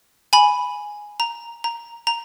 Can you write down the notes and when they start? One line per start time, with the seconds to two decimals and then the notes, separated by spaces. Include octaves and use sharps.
0.33 G#5 B5
1.20 A#5
1.64 A#5
2.07 A#5